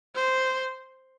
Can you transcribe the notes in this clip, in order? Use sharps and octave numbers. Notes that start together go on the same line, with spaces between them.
C5